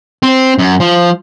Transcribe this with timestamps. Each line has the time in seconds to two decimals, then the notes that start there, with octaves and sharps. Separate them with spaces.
0.23 C4
0.58 F#2
0.80 F3